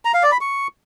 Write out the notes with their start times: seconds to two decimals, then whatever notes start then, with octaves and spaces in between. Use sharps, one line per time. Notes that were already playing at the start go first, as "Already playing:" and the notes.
0.05 A#5
0.14 F5
0.23 D5
0.32 B5
0.41 C#6